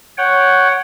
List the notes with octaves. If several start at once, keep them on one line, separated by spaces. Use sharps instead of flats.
C#5 F#5 G5